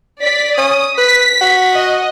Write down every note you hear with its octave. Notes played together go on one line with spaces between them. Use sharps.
D5 B6
C#4 D#6
B4 B6
F#4
D#5